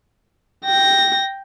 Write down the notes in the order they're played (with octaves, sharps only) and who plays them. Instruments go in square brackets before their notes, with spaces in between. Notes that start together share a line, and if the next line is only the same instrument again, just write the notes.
[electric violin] G5 A#6